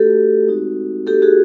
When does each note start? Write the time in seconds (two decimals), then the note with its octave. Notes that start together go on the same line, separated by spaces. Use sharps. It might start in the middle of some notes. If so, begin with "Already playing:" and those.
Already playing: A3 D4 F#4 G4 A4
0.47 G#3 C4 D#4 F#4
1.07 A#3 D#4 F#4 G4 A4
1.22 F#4 G#4